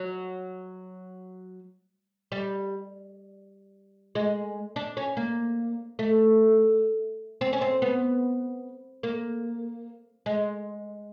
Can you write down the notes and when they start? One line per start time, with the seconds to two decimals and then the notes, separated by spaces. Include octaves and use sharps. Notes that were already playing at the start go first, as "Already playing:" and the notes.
Already playing: F#3
2.32 G3
4.15 G#3
4.76 D4
4.97 C#4
5.17 A#3
5.99 A3
7.41 C4
7.53 C#4
7.61 C4
7.82 B3
9.03 A#3
10.26 G#3